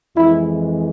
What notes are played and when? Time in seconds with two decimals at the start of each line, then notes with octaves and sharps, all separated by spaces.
0.16 F2 E3 G#3 E4